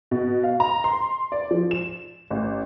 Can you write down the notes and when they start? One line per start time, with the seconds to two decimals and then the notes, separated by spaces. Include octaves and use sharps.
0.11 B2
0.44 F5
0.60 A#5
0.84 C6
1.32 D5
1.51 F3
1.71 E7
2.31 A1